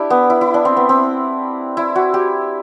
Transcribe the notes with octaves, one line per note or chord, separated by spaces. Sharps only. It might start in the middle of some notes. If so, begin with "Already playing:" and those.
Already playing: D4 E4 G4
B3
E4
E4
D4
C4
B3
C4
E4
F#4
G4